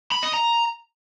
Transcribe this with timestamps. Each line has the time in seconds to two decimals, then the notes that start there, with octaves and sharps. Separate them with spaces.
0.12 B5
0.23 D#5
0.34 A#5